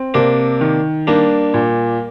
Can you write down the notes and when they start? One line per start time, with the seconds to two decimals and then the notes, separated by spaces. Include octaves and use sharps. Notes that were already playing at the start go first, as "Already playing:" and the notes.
Already playing: C4
0.14 C3 A#3 D4
0.61 D#3
1.07 G3 A#3 D4
1.54 A#2